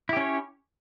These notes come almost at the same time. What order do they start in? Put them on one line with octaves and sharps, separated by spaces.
E4 G4 C#4 C#5